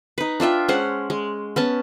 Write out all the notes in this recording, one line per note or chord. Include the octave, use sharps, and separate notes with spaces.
D#4 B4
D4 F4 E5 G5
G#3 C#4 C5 F#5
G#3
B3 C#4 A5